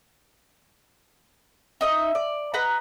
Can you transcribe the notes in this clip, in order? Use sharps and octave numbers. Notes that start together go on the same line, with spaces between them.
D#4 D#5 E5
D5
B4 D#5 F#5 A#5